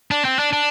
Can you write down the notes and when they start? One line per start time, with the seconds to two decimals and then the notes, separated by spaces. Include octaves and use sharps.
0.11 D4
0.25 C4
0.39 D4
0.53 D4